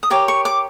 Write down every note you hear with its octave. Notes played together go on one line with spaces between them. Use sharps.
D#6
G4 A#4 C#5 D6
C#6
D6